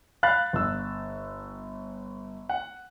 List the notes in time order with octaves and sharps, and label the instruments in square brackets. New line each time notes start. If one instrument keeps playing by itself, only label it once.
[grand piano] F5 B5 F#6 A6
G1 E6
F#5